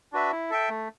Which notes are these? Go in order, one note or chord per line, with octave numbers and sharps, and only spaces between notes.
D4 F#4 B4 E5
E4
A4 E5 G5
A3